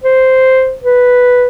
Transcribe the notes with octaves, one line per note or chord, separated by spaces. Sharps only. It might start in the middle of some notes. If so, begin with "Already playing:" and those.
C5
B4